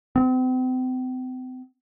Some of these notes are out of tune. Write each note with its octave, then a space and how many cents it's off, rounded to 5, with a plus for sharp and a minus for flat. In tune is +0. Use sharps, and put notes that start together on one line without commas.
C4 -40